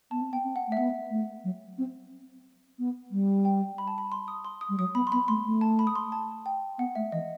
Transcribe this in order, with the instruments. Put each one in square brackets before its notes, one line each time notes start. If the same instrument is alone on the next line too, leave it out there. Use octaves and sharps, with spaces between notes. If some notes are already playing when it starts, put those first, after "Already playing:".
[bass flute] B3 [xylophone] A5
[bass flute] C4
[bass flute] B3 [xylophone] G5
[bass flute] C4
[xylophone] F#5
[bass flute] A3 [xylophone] E5
[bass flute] B3 [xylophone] F#5
[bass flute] A3
F#3
C4
B3
G3
[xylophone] G5
B5
A5
B5
C6
D#6
C6
D#6
[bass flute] G3
[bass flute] F#3 [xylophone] D#6
[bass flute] B3 [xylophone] B5
[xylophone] C6
[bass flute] B3 [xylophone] B5
[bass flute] A3 [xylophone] C6
[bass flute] A3
[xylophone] A5
B5
D#6
C6
A5
G5
[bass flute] B3 [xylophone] F#5
[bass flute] A3 [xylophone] E5
[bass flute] E3 [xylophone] D#5